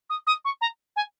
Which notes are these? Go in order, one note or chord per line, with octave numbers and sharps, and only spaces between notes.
D#6
D#6
C#6
A#5
G#5